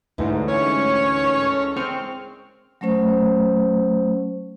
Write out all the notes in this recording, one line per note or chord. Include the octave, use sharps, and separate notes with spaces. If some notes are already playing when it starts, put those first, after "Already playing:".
D2 G#2 E3 F#3
C#4 C#5
G#3 A4 A#4
G#3 C4 C#4 C#6 F6
F#3 A3 C#4 C5